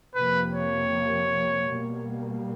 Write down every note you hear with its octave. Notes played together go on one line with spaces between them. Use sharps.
F2 C3 F3 A#3 B4
C#5
B2 G3 A#3